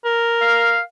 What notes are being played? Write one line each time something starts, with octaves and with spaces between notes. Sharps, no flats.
A#4
F5